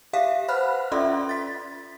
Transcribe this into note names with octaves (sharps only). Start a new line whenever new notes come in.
G4 E5 F5 B6
B4 C5 F#5 B5 F6 F#6
C#4 F4 A4 D5 E5 C6
A6 B6